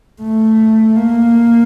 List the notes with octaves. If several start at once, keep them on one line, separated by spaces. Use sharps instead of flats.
A3
A#3